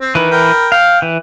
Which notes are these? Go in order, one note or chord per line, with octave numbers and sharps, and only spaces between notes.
C4
D#3 E3 B4
A#4 G5 B5
F5 G5
E3